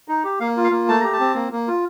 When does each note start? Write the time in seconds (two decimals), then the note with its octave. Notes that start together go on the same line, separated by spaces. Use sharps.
0.08 D#4
0.24 G4
0.40 A#3 F5
0.57 F4
0.64 F5
0.72 A#3
0.88 A3 A5
1.01 G4 A#5
1.13 A5
1.20 C4
1.35 A#3
1.52 A#3
1.68 F4